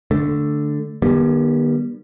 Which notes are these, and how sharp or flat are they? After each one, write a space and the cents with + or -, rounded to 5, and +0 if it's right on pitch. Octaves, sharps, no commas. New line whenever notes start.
D3 +0 A3 +0
D#3 -40 G3 +0 B3 -45